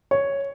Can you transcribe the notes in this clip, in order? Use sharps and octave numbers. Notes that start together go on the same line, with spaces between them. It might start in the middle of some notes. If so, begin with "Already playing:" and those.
C#5